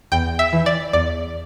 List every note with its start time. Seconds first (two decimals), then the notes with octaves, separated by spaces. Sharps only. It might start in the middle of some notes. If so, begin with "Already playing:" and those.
0.12 E2 G5
0.39 E5
0.53 E3
0.66 D5
0.93 E2 D5